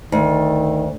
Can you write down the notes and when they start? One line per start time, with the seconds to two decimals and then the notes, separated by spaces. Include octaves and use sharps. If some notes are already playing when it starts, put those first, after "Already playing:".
0.12 D2 D#3